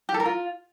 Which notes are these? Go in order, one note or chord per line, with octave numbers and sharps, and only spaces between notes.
G4
A4
A#4
F4